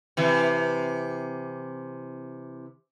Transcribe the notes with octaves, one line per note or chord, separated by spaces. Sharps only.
C3 E3